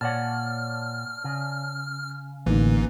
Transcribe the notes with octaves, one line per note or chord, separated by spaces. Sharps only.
A#2 C#5 D5 F#5 A5 F6
C#3
A1 A2 D3 E3 A#3 D#4